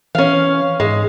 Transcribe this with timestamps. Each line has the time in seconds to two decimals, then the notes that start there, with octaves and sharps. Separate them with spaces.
0.15 E3 C#4 F5
0.80 G#2 G#3